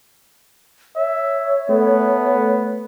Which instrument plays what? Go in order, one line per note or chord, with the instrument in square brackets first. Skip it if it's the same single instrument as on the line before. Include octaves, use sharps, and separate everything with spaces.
[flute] C#5 [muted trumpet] E5
[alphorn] A3 [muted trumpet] B3